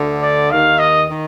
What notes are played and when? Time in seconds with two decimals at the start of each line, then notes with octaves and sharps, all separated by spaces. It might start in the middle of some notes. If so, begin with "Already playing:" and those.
Already playing: D2 D3
0.22 D5
0.50 D#2 D#3 F5
0.79 D#5
1.08 D#3